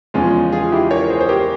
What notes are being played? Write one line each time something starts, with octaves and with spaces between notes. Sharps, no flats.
E2 C#3 F3 G#3 C#4 F4
F4 G#4
E4 G4
A#4 C#5
G#4 C5
C5
G4 A#4